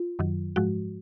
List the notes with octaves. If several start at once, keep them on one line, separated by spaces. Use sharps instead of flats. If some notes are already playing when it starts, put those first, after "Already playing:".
Already playing: F4
F#2 D#3 F#3
G#2 F3 G#3 F#4